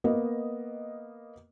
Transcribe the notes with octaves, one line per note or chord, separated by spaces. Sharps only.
A#3 B3 D#5